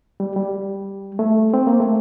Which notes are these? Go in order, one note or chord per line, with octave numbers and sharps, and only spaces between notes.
G3
G3
A3
C4
A#3
A3